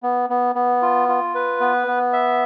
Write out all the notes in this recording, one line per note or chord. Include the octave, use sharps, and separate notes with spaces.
B3
B3
B3
F4
F4
B4
B3
B3
E5